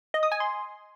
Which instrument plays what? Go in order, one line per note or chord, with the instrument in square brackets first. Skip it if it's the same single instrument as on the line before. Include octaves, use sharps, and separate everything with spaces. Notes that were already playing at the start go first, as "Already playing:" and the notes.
[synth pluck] D#5
D#6
G#5
C6